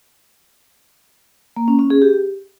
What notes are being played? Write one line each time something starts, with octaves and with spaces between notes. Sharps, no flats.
A#3
C#4
C#4
G#4
G4